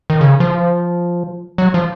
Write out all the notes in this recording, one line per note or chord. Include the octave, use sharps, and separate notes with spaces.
D#3
C#3
F3
F#3
F3